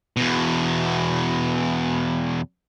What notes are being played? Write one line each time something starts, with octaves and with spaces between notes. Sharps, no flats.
E2 B2